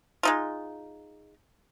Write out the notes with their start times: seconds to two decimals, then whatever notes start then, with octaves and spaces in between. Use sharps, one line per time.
0.23 G#3 D#4 F4